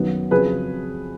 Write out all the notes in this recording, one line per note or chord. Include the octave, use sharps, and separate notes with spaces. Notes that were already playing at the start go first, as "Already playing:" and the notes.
Already playing: F#2 D#3 F#3 B3
F2 C#3 F#3 G#4 B4